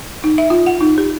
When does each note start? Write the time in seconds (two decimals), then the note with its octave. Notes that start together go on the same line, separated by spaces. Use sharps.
0.24 D#4
0.38 E5
0.50 F4
0.66 F#5
0.81 D#4
0.98 G4